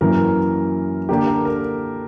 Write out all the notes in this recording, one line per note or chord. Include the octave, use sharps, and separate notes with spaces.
F#2 E3 A#3 A#4
D3 A#3 D4 G4
A#4
A#4